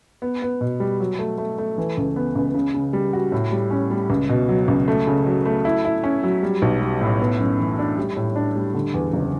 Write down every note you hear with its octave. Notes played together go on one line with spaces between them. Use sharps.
B3
B3
B2
G3
F#3
A3
A3
A3
E3
C#2
B3
C#2
C#3
C#3
G3
F#4
A2
G3
C#4
G3
C#2
B2
F#3
C#2
A3
C#3
F#3
A3
E4
E4
C#4
F#3
G3
B1
G3
A2
B3
F#2
E3
D4
G3
A2
D4
G3
D3
E2
F#1